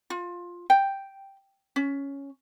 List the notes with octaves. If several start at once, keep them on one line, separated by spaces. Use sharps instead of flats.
F4
G5
C#4